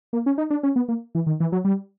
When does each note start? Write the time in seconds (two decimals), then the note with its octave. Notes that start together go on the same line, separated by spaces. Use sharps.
0.13 A#3
0.26 C#4
0.38 D#4
0.50 D4
0.63 C#4
0.76 B3
0.88 A#3
1.15 E3
1.27 D#3
1.40 E3
1.52 F#3
1.65 G3